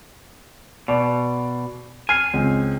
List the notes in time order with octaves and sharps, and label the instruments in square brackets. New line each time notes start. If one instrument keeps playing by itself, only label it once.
[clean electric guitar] B2 [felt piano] D5
[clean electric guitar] G#5 [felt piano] F6 C7
[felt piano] C#2 C4